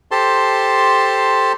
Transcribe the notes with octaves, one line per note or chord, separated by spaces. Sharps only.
G4 A4 C5 A5 C6